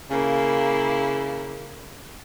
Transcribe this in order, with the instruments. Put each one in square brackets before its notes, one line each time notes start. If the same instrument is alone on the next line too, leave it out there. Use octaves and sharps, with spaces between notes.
[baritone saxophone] C#3 [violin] A#3 E4